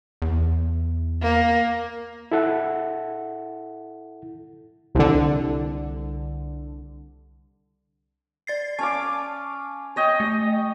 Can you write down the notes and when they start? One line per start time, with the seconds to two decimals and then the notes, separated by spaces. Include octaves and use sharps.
0.22 E2
1.21 A#3
2.32 E4 A4 F#5
4.95 C2 D3
8.47 D5 A6 C7
8.79 C#4 F5 A5 D6
9.96 C#5 D#5 G5
10.20 A3